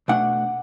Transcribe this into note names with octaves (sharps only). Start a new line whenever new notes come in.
B2 A3 D4 F#5